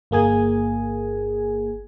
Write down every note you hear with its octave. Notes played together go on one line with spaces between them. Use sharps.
G1 A#3 G#4 G#5